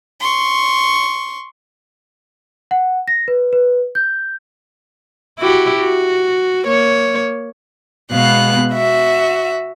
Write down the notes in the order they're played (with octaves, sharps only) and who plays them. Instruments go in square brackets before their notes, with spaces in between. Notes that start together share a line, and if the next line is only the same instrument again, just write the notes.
[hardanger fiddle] C6 C#6
[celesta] F#5
A#6
B4
B4
G6
[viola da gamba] E4 F#4 G4
F#4
A#3 C#5
[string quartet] B2 G#3 B3 F5 F#6
F#4 E5